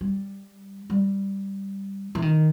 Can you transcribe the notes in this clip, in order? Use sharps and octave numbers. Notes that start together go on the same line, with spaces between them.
G3
G3
E3
D#3